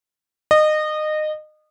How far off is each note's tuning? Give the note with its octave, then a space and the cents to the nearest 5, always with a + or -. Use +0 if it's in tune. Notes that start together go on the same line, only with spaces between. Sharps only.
D#5 -25